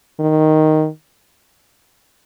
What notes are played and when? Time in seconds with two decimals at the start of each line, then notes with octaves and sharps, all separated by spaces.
0.20 D#3